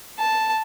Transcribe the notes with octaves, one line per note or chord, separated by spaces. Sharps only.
A5